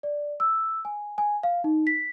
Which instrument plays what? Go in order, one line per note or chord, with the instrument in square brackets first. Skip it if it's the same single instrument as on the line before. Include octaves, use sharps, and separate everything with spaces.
[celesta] D5
E6
G#5
G#5
F5
D#4
B6